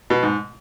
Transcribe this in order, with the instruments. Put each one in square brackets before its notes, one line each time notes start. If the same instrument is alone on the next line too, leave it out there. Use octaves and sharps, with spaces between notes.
[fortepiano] B2
G#2